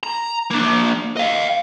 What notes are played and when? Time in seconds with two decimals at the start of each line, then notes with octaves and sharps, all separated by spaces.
0.03 A#5
0.51 A#3 D4
1.17 D#5 F5